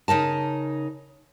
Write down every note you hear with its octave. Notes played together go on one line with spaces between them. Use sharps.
C#3 D#4 A#4 A5